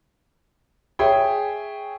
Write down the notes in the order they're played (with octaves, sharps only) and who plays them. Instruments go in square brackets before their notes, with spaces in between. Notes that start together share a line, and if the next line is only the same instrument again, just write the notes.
[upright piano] G#4 C#5 E5 G5 G#5